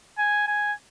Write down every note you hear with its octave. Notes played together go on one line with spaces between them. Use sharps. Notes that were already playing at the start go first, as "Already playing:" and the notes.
G#5
G#5